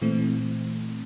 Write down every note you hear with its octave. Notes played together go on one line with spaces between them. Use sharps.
A#2 E3 A3 C4